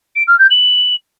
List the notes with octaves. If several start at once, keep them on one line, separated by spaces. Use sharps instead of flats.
D7
F6
G6
F#7